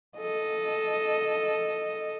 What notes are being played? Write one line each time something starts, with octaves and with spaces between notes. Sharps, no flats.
A4 D#5